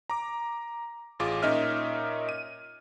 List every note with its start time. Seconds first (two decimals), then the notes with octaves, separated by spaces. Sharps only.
0.10 A#5 D6
1.20 A1 F4 G#4 D6
1.42 A#2 C#4 D#4 D#5 E5 F6
2.29 D#7